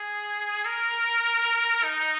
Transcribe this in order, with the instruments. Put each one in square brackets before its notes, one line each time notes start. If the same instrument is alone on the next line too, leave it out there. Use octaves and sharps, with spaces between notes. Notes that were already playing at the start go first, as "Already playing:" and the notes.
Already playing: [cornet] G#4
A#4
D#4